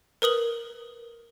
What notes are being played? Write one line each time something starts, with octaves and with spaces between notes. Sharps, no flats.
A#4 B4 D#6 F#7